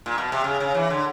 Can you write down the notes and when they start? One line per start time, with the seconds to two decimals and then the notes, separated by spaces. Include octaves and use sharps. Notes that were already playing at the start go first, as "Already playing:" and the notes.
0.06 A#2
0.18 B2
0.32 C3
0.44 C#3
0.60 C#3
0.74 E3
0.90 D3